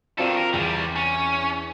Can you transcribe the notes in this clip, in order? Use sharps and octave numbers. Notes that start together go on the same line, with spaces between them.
D#3 C4 F4 A4 D5
A#4
E2 C3 G3
C#4